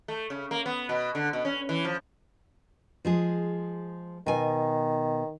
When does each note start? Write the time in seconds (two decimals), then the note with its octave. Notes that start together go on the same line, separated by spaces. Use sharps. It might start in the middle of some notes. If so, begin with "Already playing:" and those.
0.08 A3
0.30 C#3
0.51 A#3
0.66 B3
0.89 B2
1.15 D3
1.33 B2
1.45 C#4
1.69 E3
1.85 F3
3.05 F3 G#3 G#4
4.26 B2 D#3 G#5